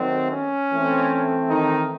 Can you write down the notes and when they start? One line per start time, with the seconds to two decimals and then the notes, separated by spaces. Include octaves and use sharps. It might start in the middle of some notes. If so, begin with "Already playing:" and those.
Already playing: D#3 F#3 A3 C4
0.31 C#4
0.71 E3 A3 C4
1.49 D#3 D#4